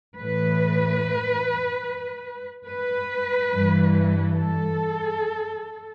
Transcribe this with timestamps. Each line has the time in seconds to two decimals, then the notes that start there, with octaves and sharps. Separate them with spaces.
0.18 A2 E3 B4
2.69 B4
3.53 G2 E3
4.35 A4